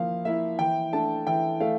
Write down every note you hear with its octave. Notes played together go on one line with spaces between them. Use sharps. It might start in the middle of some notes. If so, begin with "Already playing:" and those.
Already playing: F3 A#3 E4 F5
A#3 E4 E5
E3 G5
A3 D4 A5
E3 G5
A3 F5